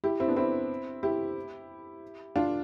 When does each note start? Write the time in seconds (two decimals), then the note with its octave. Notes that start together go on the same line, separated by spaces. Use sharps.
0.04 E4 G4
0.20 C4 E4
0.28 B3 D4
0.36 C4 E4
1.03 E4 G4
2.36 D4 F4